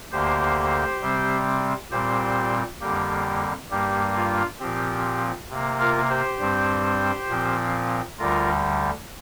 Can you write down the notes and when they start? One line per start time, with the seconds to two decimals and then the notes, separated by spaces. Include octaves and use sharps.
0.12 D2 D3 A#3 G4 C5
1.02 C3 G3 C4
1.91 A#2 G3 C4 G4 C5
2.80 F2 D3 G3 A#3 G4
3.70 G2 G3 A#3 G4
4.16 F4
4.60 A#2 F3 C4 G4
5.50 C3 A#3
5.80 F4 A#4
6.09 G4 C5
6.39 G2 G3 C4
7.29 A#2 F3 C4
8.18 D2 D3 G3 F4 A#4